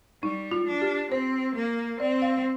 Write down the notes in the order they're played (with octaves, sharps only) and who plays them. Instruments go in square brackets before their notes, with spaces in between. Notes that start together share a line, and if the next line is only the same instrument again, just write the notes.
[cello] G3 [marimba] D#4
[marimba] F4
[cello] D4
[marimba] G4
[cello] C4 [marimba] C5
[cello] A#3
[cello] C4 [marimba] D5
[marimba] F5